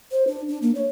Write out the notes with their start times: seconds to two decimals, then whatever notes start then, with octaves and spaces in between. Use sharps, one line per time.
0.12 C5
0.27 D4
0.49 D4
0.62 A#3
0.75 C#5